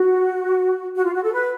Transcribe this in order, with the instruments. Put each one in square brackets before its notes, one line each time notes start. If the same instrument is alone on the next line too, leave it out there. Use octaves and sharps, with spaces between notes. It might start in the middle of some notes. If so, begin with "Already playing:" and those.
Already playing: [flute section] F#4
F#4
F4
F#4
A4
B4